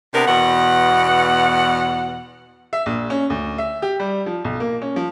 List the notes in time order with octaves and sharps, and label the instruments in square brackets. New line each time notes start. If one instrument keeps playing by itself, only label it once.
[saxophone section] C3 B3 D4 A#4
E2 B2 F#5
[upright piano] E5
A#1
C#4
D2
E5
G4
G3
F3
B1
A#3
C#4
F3